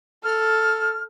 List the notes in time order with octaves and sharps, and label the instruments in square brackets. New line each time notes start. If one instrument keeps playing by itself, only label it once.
[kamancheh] A4 [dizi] F6